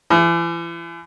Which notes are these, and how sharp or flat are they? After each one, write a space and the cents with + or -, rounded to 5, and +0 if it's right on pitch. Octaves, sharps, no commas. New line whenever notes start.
E3 +40